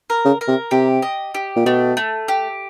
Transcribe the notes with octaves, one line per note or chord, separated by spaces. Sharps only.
A#4
C#3
A#4
C3
C3 G4
D#5
G4
A#2
B2 A3
A3
G4